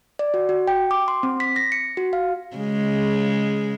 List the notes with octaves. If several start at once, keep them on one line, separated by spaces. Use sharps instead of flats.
D5
F#4
F#4
G5
D6
C6
C4
B6
A#6
C#7
F#4
F5
C#3 G#3